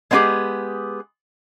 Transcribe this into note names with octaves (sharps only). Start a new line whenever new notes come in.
G#3 B3 C4 D#4 G4 G#4